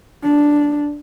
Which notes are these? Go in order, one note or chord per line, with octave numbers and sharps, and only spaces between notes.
D4